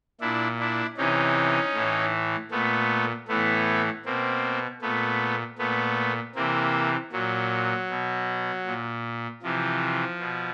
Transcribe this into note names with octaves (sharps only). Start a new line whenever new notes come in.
A#2 D4 E4
D4 E4
C3 E3 C#4 D#4
A2 E3
A#2 A3 B3
A2 E3 A3 B3
B2 A#3 C4
A#2 A3 B3
A#2 A3 B3
C3 E3 A#3 C4
A#2 F#3
B2
A#2
C3 E3 F3
B2